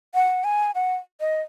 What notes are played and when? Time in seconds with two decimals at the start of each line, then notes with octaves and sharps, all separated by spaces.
0.14 F#5
0.44 G#5
0.75 F#5
1.20 D#5